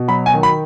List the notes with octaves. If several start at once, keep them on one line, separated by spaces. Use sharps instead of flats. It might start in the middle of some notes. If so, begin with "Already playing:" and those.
Already playing: B2
F#3 B5
G#5
D#3
B5